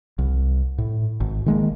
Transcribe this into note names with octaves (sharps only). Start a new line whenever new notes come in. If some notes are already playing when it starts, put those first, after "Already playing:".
C2
A2
G#1
D#3 G#3 A#3